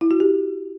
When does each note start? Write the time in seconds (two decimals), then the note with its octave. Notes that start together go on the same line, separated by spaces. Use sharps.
0.01 E4
0.11 F#4
0.20 G4